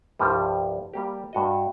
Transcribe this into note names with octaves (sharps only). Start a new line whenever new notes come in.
C2 G2 F3 G3
G3 A#3 G4
G2 F#4 D#5